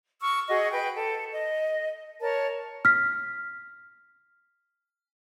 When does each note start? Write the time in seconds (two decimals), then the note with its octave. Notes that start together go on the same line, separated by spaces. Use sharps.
0.22 C#6 E6 F6
0.48 F#4 G#4 D#5
0.72 B4 G5
0.96 A4
1.33 D#5
2.21 A#4 C#5 A5
2.85 F6 B6